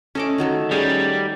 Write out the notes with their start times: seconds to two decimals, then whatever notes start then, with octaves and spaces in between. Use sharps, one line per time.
0.15 A3 C#4 D#5 D6
0.38 D#3 F#3 A3
0.71 G3 C#4 G#4